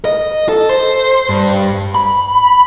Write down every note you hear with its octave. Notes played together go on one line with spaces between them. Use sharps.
D#5
A4
C5
G2
B5